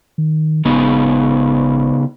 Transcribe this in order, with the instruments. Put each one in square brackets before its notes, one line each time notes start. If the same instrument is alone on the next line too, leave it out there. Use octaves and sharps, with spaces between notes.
[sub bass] D#3
[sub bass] G#1 [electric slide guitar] C#3 B3 D#4